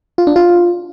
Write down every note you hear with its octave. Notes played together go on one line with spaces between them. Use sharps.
F4
D4
F4